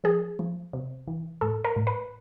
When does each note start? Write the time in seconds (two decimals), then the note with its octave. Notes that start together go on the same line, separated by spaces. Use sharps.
0.04 F3 G#4
0.39 F3
0.73 C3
1.08 E3
1.41 A2 A4
1.65 A#4
1.76 A2
1.87 B4